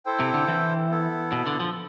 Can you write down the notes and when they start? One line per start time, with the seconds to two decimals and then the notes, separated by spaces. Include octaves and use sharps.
0.06 E4 A4 C5 G5
0.20 C3
0.34 D3
0.48 E3
0.90 B3 E4 A4
1.32 B2
1.47 D3
1.60 F3